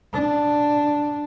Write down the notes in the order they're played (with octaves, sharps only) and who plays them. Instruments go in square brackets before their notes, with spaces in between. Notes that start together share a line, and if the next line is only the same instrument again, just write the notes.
[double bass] D4